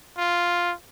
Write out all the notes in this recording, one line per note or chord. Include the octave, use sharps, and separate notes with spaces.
F4